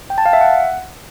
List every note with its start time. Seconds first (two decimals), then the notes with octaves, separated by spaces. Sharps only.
0.10 G5
0.18 A5
0.26 F5
0.33 E5
0.41 F#5